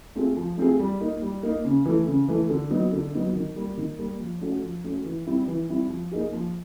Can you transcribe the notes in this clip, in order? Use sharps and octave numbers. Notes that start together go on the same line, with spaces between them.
A3 C4 F4 G#4
F3
A3 C4 F4 G#4
G3
A#3 D#4
G3
A#3 D#4
C#3
E3 A3
C#3
E3 A3
D3
F#3 B3 D#4
D3
F#3 B3 D#4
D#3
G3 A#3
D#3
G3 A#3
F3
A3 C#4 F#4
F3
A3 C#4 F#4
E3
G3 C4 E4
E3
G3 C4 E4
F3
A#3 D#4 G#4
F3